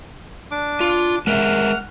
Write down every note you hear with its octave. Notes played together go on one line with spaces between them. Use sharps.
D4 D6
F4
G#3 A#4 E5 F#5 F6